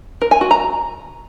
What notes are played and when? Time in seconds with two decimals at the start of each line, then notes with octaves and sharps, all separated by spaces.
0.22 A#4
0.31 G#5
0.41 F#4
0.51 A#5